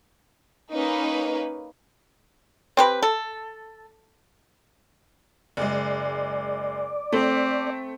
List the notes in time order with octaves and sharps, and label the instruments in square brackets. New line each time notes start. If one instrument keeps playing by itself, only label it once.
[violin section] A#3 C#4 D#4 B4
[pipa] C4 G4 B4
A4
[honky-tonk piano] F#1 G#3 [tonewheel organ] D5
[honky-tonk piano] A3 [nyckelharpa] C4